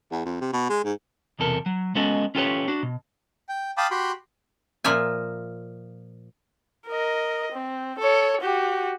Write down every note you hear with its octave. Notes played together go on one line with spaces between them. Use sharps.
E2
F2
C3
B2
G#3
G#2
B1 E2 C3 A4 A#4
F#3
G#3 B3 C#4 F#4 A4 D#5
C#4 F4 G4 A4 B4 C#5
D4 F#4
B2
G5
F5 G5 A5 B5 D6 D#6
F#4 G4 G5 B5 C6
A#2 F3 A#3 E5 G#5
A#4 D#5
C4
A4 C#5
F#4 G4